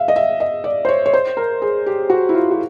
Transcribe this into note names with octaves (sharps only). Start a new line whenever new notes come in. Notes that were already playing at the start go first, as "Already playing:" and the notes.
Already playing: E5 F5
D#5
E5
D#5
D5
C5
C#5
C#5
C5
A#4
G#4
G4
F#4
E4
F4
F#4